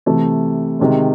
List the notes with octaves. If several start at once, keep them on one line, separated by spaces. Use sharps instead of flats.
C3 E3 A3
C3 D#3 G#3